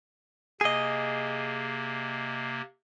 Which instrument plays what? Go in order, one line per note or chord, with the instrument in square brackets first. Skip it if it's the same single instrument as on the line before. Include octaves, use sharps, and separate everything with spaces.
[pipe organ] C3 A#3 [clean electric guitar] G#4 D#5